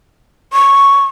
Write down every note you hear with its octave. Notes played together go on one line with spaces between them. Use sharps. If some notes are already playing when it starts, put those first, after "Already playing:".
C#6